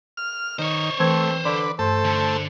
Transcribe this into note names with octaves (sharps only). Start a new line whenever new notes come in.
F6
D#3 C5 C#5
E3 A3 C4 B4 G#6
D3 D4 B4 C6
G2 A3 A4 C5
D3